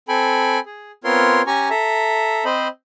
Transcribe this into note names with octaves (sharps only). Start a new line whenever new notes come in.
C4 A4 G5 G#5 B5
G#4
B3 C4 F4 A#4 C#5 C6
C#4 G4 G#5 A#5 C#6
A4 E5 A#5
C4 C5 D#5 B5